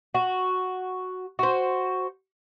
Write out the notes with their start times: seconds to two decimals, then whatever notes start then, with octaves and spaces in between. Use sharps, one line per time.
0.15 F#4
1.39 F#4 C5